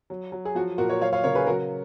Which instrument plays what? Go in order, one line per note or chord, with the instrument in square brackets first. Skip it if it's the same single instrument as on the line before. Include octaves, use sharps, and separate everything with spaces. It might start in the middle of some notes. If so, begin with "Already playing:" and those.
[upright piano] F#3
F#3
G#4
F3 F#4
A#2 F#4 A#4
A#4 C#5
F#3 C#5 F5
C#5 F5
C#3 A#4 C#5
G#4 B4
F#3 F#4 A#4